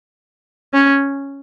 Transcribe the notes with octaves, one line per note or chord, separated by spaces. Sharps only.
C#4